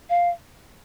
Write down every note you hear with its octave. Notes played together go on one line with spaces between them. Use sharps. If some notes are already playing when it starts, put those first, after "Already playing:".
F5